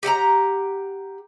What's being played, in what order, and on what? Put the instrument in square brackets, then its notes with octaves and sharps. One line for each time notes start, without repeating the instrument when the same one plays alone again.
[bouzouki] G4 F#5 A5 A#5